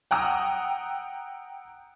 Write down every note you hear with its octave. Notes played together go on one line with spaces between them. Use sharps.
F#5 G5 A#5 D#6 E6